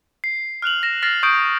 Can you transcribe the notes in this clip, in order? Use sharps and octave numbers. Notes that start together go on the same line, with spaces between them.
C7
F6 F#6 F7 F#7
A#6 E7
F6 A6 A#6 C7
C#6 D#6 G6 D7